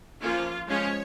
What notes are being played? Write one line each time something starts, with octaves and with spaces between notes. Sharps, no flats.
F3 A#3 C#4 F4
F3 G#3 C#4 C#5